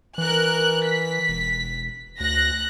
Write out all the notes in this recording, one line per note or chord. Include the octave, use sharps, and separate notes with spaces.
E3 A#4 F#6
B6
E1
D2 F#6 A#6